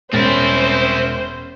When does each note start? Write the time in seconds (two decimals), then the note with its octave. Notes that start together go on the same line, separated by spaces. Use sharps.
0.13 E1 C4 C#4 E4 C5 A6